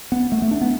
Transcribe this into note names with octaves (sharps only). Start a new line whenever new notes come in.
B3
A3
A3
D4
B3